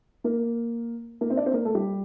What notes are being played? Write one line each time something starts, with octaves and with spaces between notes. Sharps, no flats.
A#3 A#4
A#3 A#4
C4 C5
D4 D5
C4 C5
A#3 A#4
A3 A4
G3 G4